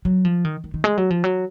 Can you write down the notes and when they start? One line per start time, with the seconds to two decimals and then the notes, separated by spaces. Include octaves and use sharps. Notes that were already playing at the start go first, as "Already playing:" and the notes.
0.05 F#3
0.25 F3
0.45 D#3
0.64 D#3
0.74 D#3
0.84 G#3
0.98 F#3
1.10 F3
1.24 F#3